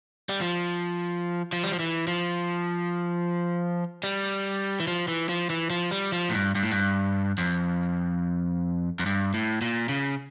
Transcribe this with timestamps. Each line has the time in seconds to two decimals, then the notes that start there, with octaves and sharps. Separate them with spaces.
0.29 G3
0.41 F3
1.53 F3
1.63 G3
1.72 F3
1.79 E3
2.07 F3
4.04 G3
4.80 E3
4.87 F3
5.08 E3
5.29 F3
5.50 E3
5.70 F3
5.91 G3
6.12 F3
6.29 A2
6.34 G2
6.55 G2
6.63 A2
6.71 G2
7.38 F2
8.99 F2
9.06 G2
9.34 A2
9.62 A#2
9.89 C#3